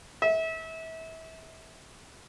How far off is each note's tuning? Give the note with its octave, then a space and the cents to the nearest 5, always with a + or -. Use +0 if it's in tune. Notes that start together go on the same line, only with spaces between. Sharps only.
E5 -30